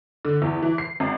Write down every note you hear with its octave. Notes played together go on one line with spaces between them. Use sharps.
D3
E2
E3
C7
G#1